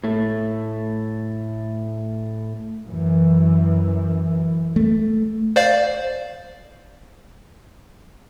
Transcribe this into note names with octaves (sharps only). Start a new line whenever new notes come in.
A2 A3
F#2 E3
A3
C5 D5 F5